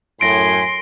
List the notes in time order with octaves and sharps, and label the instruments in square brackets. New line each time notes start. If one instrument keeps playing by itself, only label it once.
[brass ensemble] F#2 A2 G#5 [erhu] C6 [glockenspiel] A#6 D7